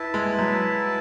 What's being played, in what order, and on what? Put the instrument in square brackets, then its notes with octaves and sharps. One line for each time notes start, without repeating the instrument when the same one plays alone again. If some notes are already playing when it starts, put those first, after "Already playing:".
Already playing: [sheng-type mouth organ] E4 B4 E5 A5
[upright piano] G#3
F#3